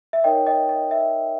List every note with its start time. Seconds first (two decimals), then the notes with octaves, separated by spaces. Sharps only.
0.13 E5
0.24 D#4 A#4 C#5 D#5 G5
0.46 D#5 G5
0.69 D#5
0.91 E5